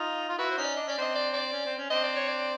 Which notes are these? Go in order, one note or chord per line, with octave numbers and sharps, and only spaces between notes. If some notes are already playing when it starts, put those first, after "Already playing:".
Already playing: D#4 F4
F4
E4 F#4 B4
C5
C#4 D#4
D5
D4 D#5
C#4 D5
C4 D4 D#5
D5
D5
C#4
C4
C#4
C4 D4 D#5
D5
C#5
D5